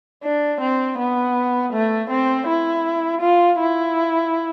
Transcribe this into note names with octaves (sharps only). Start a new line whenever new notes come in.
D4
C4
B3
A3
C4
E4
F4
E4